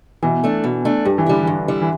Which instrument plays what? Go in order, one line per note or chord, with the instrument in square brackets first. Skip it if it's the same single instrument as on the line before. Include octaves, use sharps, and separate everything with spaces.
[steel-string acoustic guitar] B2 [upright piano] E3
[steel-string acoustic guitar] A3 D4
B2
A3 D4
[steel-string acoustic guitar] G2 [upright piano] G3
[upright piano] E3
[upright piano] D3 [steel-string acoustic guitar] G3 E4
[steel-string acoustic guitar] G2 [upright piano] E3
[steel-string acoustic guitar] G3 E4
[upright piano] E3